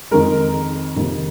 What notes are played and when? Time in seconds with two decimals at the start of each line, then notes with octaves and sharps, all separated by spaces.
0.11 F2 D#3 G#3 A#4
0.96 F2 C3 D#3 A#3